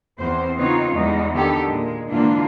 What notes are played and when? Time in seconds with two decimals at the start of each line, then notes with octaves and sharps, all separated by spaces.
0.19 E2 C4 C5
0.56 C#3 B3 C4 D#4 F4 C#5
0.92 E2 G3 G#3 D#4
1.34 D3 D#3 B3 G4 A4
1.67 A#2 G#3
2.07 G#2 D3 E3 A#3 D4 F4